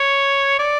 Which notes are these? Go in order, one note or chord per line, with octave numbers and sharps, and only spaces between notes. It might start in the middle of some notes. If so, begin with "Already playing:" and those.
Already playing: C#5
D5